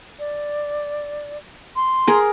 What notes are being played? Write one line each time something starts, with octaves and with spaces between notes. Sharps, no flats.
D5
C6
G#4 A#4